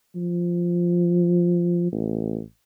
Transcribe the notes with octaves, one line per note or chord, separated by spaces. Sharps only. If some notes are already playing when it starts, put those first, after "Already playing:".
F3
A1